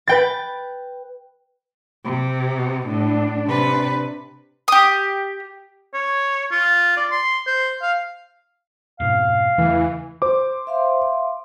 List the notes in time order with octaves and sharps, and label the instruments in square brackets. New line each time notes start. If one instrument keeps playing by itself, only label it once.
[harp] B4 G5 A6
[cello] C3
[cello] A2 [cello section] D4
[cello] C3 B4
[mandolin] G4 D#6
[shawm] C#5
F4
D5
C6
C5
F5
[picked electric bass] F2 G#2 B2 [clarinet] F5
[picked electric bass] E2 C#3 A3 [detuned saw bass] E3
[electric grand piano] C5 D6
[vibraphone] E5 F5 C6